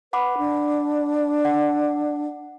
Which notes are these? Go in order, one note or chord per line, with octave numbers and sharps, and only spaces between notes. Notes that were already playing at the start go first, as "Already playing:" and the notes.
B4 F#5 B5 D6
D4
F#5